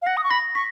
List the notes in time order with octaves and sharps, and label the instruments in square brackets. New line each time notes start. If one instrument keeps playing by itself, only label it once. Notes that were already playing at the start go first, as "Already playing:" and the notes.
[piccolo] F5
[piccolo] F#5 [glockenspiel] A#6
[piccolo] D#6
C#6
[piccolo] B5 [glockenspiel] A#6
[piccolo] C#6 [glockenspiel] B6